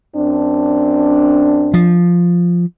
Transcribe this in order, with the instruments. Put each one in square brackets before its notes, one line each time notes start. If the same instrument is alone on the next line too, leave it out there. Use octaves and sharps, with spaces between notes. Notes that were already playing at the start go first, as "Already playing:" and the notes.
[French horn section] F#2 C4 D4
[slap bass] F3